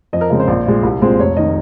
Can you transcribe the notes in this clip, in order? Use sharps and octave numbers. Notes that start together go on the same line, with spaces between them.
F2 D#5
A#4
C#3 G#3 C4
C5
A#1
A#2 G#3
C2
A#2 G#3 C4
F1 C#5
D#3 D#5